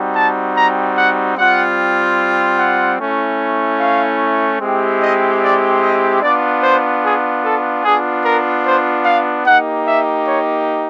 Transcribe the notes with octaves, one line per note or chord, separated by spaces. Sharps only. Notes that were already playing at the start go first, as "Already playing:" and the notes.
Already playing: G3 C4 D#4 F#4
A5
A#5
F#5
G3 C4 F4 F#5
F#5
A3 C#4 E4
F5
G#3 C4 E4 G4
D#5
D5
D#5
B3 D4 F4 D5
C5
G#4
A4
B3 D4 F4 G#4
A#4
C5
F5
A#3 D#4 G4 F#5
E5
C#5